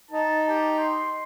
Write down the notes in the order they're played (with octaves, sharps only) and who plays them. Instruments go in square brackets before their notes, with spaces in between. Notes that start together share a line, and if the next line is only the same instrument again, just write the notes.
[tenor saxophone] D#4 [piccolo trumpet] A5
[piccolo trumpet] G4
C6